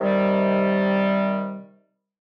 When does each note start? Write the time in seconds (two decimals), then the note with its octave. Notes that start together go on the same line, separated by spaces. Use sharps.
0.01 C3 D#3 G3